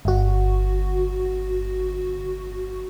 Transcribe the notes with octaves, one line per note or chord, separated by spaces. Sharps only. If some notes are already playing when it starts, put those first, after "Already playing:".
G1 F#4